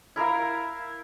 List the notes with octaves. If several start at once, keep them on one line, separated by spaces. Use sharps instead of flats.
E4 A#4 E5 F5